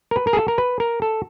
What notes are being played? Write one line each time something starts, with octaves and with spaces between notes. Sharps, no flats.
A#4
B4
A#4
G#4
A4
A#4
B4
A#4
A4